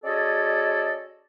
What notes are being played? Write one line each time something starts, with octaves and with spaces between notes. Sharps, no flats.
C#4 F#4 G#4 A4 D5 D#5